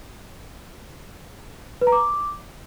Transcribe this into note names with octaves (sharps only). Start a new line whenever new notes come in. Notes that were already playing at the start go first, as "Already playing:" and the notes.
B4
A#5
D6